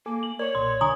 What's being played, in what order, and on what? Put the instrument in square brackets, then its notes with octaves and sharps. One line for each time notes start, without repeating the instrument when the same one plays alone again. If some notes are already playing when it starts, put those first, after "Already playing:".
[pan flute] A#3 [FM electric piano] A4 G#5 D6
[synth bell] F#7
[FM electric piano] A#4 C#6 [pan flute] C#5 [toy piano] D5
[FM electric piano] B1 A#2 [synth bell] C6
[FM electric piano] C2 D3 [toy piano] G#5 D#6 [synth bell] A#5